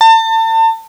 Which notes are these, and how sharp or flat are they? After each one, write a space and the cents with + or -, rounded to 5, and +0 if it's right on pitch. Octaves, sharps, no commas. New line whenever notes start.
A5 +35